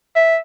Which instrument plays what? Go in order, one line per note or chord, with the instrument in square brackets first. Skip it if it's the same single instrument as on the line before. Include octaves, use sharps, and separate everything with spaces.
[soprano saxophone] E5